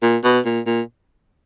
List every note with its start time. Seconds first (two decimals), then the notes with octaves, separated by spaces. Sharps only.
0.02 A#2
0.24 B2
0.45 A#2
0.66 A#2